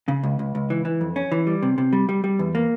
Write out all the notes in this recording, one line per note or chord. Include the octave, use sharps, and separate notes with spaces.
C#3
C#2
C#2
C#2
E3
E3
F2
C#4
E3
G3
C3
C3
G3
G3
G3
E2
A#3